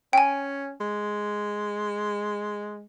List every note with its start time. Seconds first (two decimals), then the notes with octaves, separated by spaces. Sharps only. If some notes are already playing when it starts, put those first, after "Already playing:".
0.13 C#4 G5 G#5
0.80 G#3